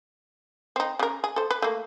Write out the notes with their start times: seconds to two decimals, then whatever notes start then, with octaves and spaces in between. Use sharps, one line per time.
0.76 C4 D#4
0.99 C#3 A#4
1.24 G#4
1.36 A4 C5
1.51 B4
1.62 A3 A#3